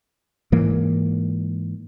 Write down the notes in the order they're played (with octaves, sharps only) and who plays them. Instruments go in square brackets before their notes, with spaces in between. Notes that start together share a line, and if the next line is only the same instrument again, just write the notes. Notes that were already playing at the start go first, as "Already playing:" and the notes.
[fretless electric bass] G#2 E3 A#3